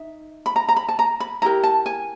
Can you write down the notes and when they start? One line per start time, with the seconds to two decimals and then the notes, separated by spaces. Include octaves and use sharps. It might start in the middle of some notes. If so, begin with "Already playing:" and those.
Already playing: D#4 E5
0.46 B5
0.56 A#5
0.69 A#5
0.76 B5
0.89 A5
0.99 A#5
1.20 B5
1.42 E4 G4 A#4 A#5
1.63 A5
1.86 G#5